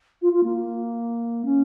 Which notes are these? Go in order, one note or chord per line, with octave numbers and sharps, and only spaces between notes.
F4
F4
A#3
C#4